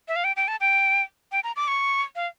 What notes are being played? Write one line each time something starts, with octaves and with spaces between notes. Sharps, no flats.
E5
F5
G5
G5
A5
G5
G5
A#5
D6
C#6
F5